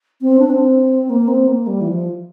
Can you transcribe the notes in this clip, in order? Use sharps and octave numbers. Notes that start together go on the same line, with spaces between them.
C4
D4
C4
A#3
C4
A#3
G3
E3
F3